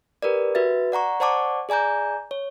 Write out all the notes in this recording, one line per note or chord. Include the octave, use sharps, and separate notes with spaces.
G4 A#4 B4 D5
F#4 B4 E5 A6
D5 F#5 A#5 C#6
C5 D5 F#5 A5 C#6 D6
G#4 D5 G#5 A#5 G6
C#5